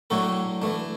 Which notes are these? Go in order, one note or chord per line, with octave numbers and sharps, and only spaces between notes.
A2 F#3 A3 D4 F#4 A4
E3 A3 D4